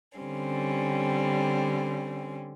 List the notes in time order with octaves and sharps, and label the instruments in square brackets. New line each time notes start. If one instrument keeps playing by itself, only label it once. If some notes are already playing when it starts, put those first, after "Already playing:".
[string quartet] D3 G3 C4 C#4